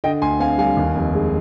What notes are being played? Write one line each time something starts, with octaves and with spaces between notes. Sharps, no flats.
D3 D#5 G5
D2 G#5 C6
C4 F5 G#5
G3 F5 G#5
D#2
F1
G#3